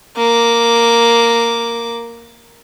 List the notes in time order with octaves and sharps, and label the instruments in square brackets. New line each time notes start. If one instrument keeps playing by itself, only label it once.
[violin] A#3 D6